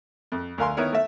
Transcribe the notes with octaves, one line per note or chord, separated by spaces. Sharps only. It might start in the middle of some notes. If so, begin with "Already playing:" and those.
F2
D2 A#4 F5 G#5 C6
D#3 B3 E4 A#4 C#5
A3 E5